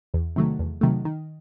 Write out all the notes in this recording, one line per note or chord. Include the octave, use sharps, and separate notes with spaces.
E2
C3 D#3 F#3 A3
E2
C3 D#3 F#3 A3
D#3